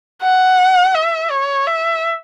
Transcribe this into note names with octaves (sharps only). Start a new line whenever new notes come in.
F#5
E5
C#5
E5